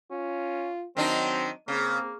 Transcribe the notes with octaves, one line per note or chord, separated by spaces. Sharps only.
C#4 F4
D#3 F#3 C4 D4 D#4
C#3 A#3 C4